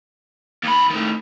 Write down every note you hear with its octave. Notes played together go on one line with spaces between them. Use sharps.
D#2 B5
A2 D#3